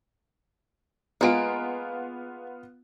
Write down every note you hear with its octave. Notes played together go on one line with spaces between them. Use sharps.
G#3 A#3 B3 F4 D7